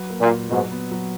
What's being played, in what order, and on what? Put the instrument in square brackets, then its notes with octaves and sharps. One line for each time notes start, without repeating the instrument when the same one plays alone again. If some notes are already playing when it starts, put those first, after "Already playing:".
Already playing: [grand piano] F#3 B4
A#3
[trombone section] A#2
[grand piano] A#2
[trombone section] G#2 B2 [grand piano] F#3
[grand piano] B3
F#3